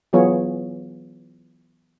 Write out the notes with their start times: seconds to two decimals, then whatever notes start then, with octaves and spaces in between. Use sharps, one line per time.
0.13 E3 F#3 B3 F4 G#4 C#5